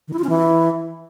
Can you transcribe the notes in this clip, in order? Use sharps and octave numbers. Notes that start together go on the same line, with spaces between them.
D#3
E4
F4
C#4
E3